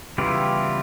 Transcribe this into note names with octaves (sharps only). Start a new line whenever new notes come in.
C#3 E3 G3 B3 E4 F4 G4